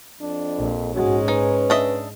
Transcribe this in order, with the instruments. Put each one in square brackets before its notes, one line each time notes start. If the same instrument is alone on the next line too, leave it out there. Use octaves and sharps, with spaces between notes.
[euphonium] F2 [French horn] D4
[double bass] A#1
[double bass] G#2 G#3 [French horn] C#4 [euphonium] F#4
[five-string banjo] D#4 [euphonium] B4
[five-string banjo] D4 D#5 E5